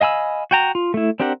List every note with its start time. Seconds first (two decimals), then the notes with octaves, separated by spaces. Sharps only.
0.01 D#5 F5 G#5 B5 E6
0.51 F#4 G5 A#5
0.75 F4
0.94 A3 E4
1.20 C4 D4 G4 A#4 F#5